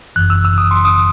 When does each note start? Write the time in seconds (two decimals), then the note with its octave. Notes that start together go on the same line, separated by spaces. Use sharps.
0.16 G1 F#2 E3 F#6
0.30 E6
0.45 E6
0.58 D#6
0.71 C6
0.85 D#6